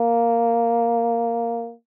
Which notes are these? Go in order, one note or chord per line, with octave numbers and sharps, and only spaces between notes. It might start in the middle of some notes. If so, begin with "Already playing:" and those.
Already playing: A#3